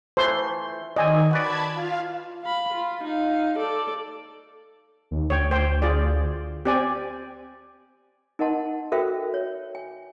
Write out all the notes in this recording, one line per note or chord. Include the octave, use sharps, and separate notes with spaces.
E3 A3 C5 C6
D#3 C4 D5 D#5 G#5
F#4 B4 D5 A5 B5 G#6
F4 F5
F5 B5
F4
D#4 F5
A4 D5
D#2
D2 C#5 G5
C5 G5
F4 G#4 D5
C4 G4 D5 G#5
D#4 A#4 D#5 F#5 A5 C6
F#4 A4 A#4 C5 E5 G5
C#5
G#5